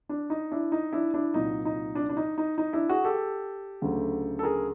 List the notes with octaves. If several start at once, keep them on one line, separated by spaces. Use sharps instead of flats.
D4
D#4
D4 E4
D#4
D4 E4
D4 E4
C2 A#2 F#3 D#4
D#4
D4
D4
D#4
D#4
D#4
D4 E4
F#4 G#4
G4 A4
D2 C#3 F#3 A3
A4
G#4 A#4